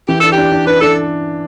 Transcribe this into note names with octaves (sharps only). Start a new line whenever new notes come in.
E3 G4
D4 A4
G4
D4
D4
D4 B4
D4 A4